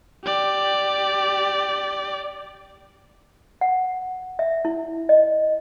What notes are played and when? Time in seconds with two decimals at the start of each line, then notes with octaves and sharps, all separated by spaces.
0.24 G4 D5
3.61 F#5
4.39 E5
4.65 E4
5.09 D#5